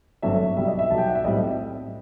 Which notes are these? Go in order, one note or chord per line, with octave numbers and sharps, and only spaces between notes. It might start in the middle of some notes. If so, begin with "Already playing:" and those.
G1 G2 F#3 A3 C4 E5
B1 B2 G3 E5
D#5
E5
B1 B2 G3 A5
G5
F#5
E5
B1 A2 G3 C4 D#5